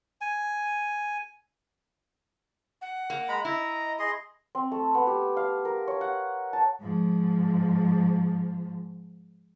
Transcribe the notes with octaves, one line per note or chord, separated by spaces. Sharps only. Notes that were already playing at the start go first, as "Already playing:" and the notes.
G#5
F#5
A#3
G#3 A#5 B5
E4 D#5 A#5
G#4 D#5 C6
C4
A3
B3
G4
F5
A#4
C#5
F#5
A5
G#2 F3